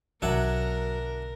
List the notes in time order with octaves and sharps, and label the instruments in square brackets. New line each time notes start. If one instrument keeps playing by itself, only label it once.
[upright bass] B1 D3 [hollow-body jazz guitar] F#3 [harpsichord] D4 E5 F#5 [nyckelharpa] A#4